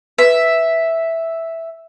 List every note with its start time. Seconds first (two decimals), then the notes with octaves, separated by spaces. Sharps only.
0.18 B4 E5